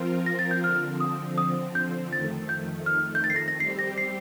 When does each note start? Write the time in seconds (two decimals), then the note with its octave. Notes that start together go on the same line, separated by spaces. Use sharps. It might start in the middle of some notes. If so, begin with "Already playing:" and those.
Already playing: F3 C4 F4 A#4
0.26 A#6
0.39 A6
0.51 G6
0.64 D3 F3 C4 F6
1.00 D#6
1.38 D#6
1.75 G6
2.12 F2 D#3 A3 A6
2.49 G6
2.86 F6
3.15 G6
3.24 A6
3.30 C7
3.36 A#6
3.48 A#6
3.60 G3 C4 G4 C7
3.79 A#6
3.98 C7